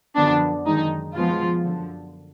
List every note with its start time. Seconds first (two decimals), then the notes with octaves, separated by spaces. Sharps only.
0.16 F#2 D3 F3 B3 D4
0.66 F#2 D#3 G#3 D#4
1.14 B2 F3 G#3 B3 F4
1.63 F#2 D3 F3